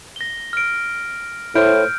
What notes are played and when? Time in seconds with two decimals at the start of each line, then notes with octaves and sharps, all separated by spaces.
0.16 A#6 G7
0.53 F6 D7
1.55 A2 E4 C5 F6 G6 D7